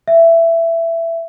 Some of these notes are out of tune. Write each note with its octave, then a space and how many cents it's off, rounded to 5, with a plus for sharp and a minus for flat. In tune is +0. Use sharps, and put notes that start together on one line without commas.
E5 +15